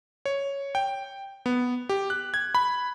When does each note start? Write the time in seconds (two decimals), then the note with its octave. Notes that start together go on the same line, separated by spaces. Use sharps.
0.26 C#5
0.75 G5
1.46 B3
1.89 G4
2.10 F#6
2.34 G#6
2.55 B5